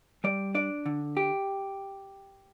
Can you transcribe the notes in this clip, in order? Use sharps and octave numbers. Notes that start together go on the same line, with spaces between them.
G3 D5
D4 D5
D3
G4